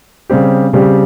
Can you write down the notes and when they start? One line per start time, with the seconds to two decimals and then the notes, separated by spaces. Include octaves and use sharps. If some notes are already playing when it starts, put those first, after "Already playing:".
0.30 C#3 G3 C4 G4
0.73 C#3 G3 C4 G4